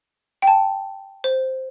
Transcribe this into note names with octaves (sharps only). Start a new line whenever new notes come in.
G5
A5
C5